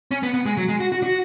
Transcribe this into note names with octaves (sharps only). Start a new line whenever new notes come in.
C#4
B3
B3
G#3
F#3
G#3
F#4
F#4
F#4